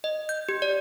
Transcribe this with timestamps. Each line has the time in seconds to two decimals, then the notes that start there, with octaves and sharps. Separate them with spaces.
0.04 D#5
0.29 G6
0.49 G4
0.62 D5